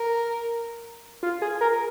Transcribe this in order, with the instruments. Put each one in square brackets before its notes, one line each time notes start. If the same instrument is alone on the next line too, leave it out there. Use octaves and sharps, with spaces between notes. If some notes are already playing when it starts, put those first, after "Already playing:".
Already playing: [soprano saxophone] A#4
[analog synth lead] F4
G#4
A#4